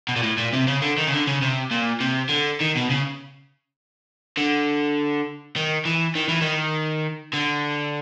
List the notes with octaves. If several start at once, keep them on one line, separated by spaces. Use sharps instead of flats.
B2
A#2
A2
A#2
C3
C#3
D3
D#3
C#3
D3
C#3
C3
A#2
C3
D3
D#3
B2
C#3
D3
D#3
E3
D#3
E3
D#3
D3